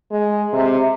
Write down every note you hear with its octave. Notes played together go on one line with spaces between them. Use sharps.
G#3
C3